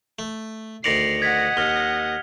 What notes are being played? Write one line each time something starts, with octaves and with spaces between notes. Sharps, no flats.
A3
D2 D#3 D5 A#6 C7 C#7 F7
D#5 F#5 G#6 B6
D#2 F6 F7 G7